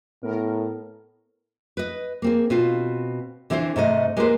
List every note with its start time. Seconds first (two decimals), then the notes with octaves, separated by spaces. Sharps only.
0.23 A2 B3 A#4
1.77 B4 D#5
2.22 A#3 C4 G#4
2.50 B2 C4 F4
3.50 D3 E3 C4 A4 C5
3.76 G#2 C3 A3 D#5
4.17 G#3 A#3 G4 B4 C5